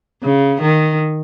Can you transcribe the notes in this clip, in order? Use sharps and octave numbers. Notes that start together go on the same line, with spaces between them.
C#3
D#3